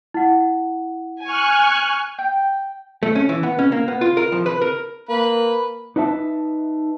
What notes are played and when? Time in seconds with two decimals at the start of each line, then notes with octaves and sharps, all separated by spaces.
0.14 E4 F#5
1.23 G#5 C#6 F6 F#6
2.18 G5
3.03 A3
3.15 C#4
3.29 E3
3.43 B3
3.59 C#4
3.72 A#3
3.88 B3
4.01 F4
4.17 A#4
4.32 F3
4.46 B4
4.62 A#4
5.09 A#3 B4
5.96 D#4 B4 D#5 E5 A5